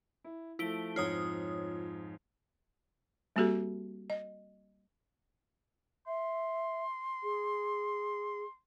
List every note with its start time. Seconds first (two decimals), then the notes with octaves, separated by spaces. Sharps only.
0.24 E4
0.59 F3 A3 E4 D7 G7
0.96 F2 G#2 F4 C#5 D#6
3.36 G3 A#3 C4 F#4 G4 A4
4.10 D#5
6.07 E5 C6
7.23 G#4